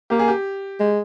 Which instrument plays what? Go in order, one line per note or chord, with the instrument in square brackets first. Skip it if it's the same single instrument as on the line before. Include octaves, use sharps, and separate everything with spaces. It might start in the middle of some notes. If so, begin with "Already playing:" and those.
[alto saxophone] A#3 [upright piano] G4
[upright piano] G#4
G4
[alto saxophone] G#3